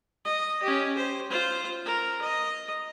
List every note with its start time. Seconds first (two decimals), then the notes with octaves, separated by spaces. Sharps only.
0.25 D#5
0.63 C#4 G4
0.97 C5
1.30 F4 C5
1.86 A#4
2.21 D#5